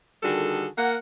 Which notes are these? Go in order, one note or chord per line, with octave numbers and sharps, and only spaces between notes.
D3 D#3 G3 F#4 G#4 A4
A#3 F#5